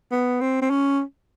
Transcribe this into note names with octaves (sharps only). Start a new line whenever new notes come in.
B3
C4
C4
C#4